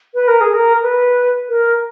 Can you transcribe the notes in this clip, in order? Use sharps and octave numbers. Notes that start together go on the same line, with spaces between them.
B4
A#4
G#4
A#4
B4
A#4